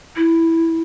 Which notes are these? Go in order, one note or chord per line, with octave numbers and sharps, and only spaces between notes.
E4